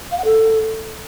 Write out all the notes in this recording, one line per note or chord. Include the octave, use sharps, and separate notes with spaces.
F5
F#5
A4